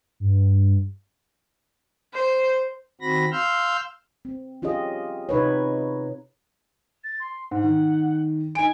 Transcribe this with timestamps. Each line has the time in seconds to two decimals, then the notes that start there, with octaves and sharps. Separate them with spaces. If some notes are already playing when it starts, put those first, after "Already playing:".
0.20 G2
2.14 C5
3.01 D#3 C4 F#4 B5 A#6
3.32 F5 C6 E6 F6 G6
4.25 C4
4.62 C#4 F4 G4 G#4 D#5
5.29 C3 D#4 B4 C#5
7.03 A6
7.19 C6
7.51 G#2 F#5
7.63 D#3
8.55 D#4 G#5 D7